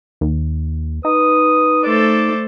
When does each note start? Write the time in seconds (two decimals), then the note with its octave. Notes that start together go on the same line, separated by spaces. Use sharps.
0.21 D#2
1.05 D#4 B4 D#6
1.83 A3 A4 C5 D5